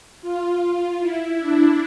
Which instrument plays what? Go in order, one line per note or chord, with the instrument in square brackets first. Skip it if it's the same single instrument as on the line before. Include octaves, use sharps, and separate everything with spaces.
[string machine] F4
F4
E4
D4